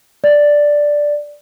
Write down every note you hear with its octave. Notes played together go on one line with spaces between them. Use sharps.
D5